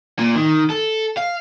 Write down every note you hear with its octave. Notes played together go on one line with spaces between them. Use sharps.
A#2
D#3
A4
F5